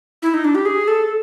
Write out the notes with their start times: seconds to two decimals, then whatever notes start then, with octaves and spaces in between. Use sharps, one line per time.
0.22 E4
0.34 D#4
0.44 D4
0.55 G4
0.65 G#4
0.88 A4